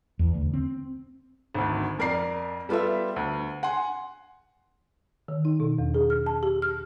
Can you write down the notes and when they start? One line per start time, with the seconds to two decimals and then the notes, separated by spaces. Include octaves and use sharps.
0.19 E2
0.34 D2
0.54 C4
1.55 G#1 D2
1.99 F2 A#4 D5 C7
2.69 G3 B3 F4 A4 E5
3.16 D2
3.63 F#5 G#5 C6
5.28 D#3
5.45 D#4
5.60 B2
5.78 E2
5.94 G#4
6.10 F6
6.26 A5
6.43 G4
6.62 F6